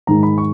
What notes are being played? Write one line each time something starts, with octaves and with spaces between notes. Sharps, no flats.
G#2 D#3 G#3 A#5
B5
C#6